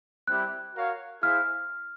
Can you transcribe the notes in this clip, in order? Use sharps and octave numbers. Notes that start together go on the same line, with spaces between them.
G3 C4 E4 G4 F#6
F#4 A#4 C#5 F5
E4 G#4 C5 F5 F6